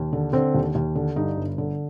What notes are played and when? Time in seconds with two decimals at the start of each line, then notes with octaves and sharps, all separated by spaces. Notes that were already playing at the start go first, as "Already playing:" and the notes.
Already playing: D#2
0.13 D3
0.33 D3 C4
0.54 D#2
0.75 D#2
0.95 D3
1.16 G2 D#4
1.37 G1
1.58 D3